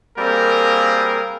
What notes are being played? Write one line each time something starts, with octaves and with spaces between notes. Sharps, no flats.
G3 A#3 C4 G#4 A#4